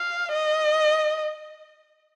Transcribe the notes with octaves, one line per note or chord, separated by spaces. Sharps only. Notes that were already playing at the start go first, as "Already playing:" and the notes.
Already playing: F5
D#5